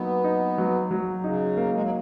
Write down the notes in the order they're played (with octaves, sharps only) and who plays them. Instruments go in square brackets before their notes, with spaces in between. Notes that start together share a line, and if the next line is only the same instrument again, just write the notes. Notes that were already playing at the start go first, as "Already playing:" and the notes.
Already playing: [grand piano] F#3 A#3 D#4 [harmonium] B3
[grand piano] D#4
F#3
F#3
[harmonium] C#3 [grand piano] D#4
[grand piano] A#3
[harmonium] G#3
F#3